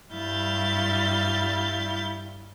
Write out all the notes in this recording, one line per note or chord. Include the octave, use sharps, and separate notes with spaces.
G2 G3 E4 F5 G6 A6